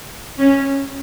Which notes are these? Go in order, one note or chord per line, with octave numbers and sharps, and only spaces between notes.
C#4